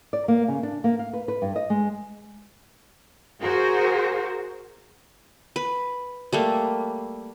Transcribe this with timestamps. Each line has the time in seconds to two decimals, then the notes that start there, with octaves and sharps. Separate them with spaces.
0.13 D5
0.28 A#3
0.48 C#3
0.63 D4
0.84 A#3
0.99 F5
1.13 B4
1.28 B4
1.42 G2
1.56 D#5
1.70 G#3
3.39 F#4 G#4 A#4 C5
5.56 B4
6.33 G3 A3 A#3